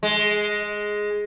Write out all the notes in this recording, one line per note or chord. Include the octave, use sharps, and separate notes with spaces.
G#3